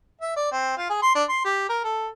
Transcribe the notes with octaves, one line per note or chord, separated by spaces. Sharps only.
E5
D5
C4
F4
G#4
C6
D4
C6
G4
A#4
A4